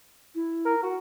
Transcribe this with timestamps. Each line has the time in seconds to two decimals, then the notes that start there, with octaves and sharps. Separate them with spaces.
0.35 E4
0.66 A#4
0.83 F#4 F#5